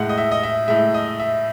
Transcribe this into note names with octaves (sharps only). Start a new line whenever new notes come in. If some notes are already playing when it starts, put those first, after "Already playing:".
Already playing: A2 G#3 F#5
D#5
E5
D#5
E5
A2 G#3 E5
D#5
E5